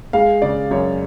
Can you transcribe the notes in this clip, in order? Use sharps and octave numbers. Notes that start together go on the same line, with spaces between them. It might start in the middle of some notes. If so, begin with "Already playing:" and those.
G#3 F5
C#3 D5
F#2 C#5